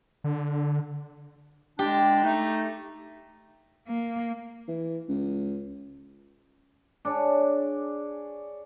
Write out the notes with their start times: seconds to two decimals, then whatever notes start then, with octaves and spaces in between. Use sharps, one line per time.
0.24 D3
1.79 D3 G#3 D4 G4
2.24 A3 D#4
3.88 A#3
4.68 E3
5.09 C#2
7.05 D4 G#4 C#5